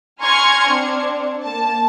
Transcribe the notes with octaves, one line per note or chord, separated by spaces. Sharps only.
G#5 A#5 C6 C#6 F6 G#6
C4 D4
A#3 A5